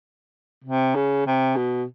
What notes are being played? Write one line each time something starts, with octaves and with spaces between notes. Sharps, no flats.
C3
C#3
C3
B2